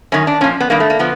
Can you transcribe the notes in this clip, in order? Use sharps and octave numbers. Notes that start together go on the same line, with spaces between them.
F#2 D#3 C#4
D4
A#2 F3 C#4
B3
G2 D#3 A#3
A3
A#3
D3 F3 B3